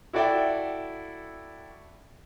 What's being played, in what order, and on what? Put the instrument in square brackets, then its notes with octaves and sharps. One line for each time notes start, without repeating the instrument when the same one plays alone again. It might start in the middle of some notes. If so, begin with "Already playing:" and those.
[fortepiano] E4 F#4 A4 D5 E5 G5